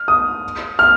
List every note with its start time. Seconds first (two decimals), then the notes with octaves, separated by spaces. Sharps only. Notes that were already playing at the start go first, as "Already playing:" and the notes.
Already playing: F6
0.08 D#6
0.79 F6